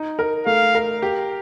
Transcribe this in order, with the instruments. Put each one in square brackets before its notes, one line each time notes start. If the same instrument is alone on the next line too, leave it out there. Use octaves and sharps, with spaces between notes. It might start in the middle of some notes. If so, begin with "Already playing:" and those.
Already playing: [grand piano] D#4
A#4
[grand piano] A3 [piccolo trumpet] F5
[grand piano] A#4
G4